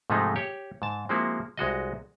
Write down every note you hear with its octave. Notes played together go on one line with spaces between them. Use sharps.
G#2 C3 F3 G#3 A3 D#4
G4 C#5
G#2 A5
F3 G#3 A#3 C4 E4 F#4
C2 G#3 F#4 D#5